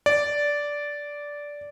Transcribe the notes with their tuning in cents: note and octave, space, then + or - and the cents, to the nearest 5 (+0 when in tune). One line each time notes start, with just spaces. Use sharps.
D5 -10